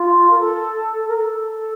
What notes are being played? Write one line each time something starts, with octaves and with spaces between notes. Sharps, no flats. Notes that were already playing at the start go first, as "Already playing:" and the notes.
Already playing: F4
A#4
A4
A#4
A4